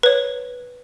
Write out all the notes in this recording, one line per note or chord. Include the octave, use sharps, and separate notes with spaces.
B4 C#5